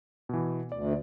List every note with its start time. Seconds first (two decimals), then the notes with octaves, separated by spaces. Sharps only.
0.29 B2 E3
0.72 D2 D5